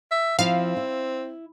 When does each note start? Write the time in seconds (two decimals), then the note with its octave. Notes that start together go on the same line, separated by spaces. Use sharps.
0.11 E5
0.39 F3 C4 E4 F5
0.77 E4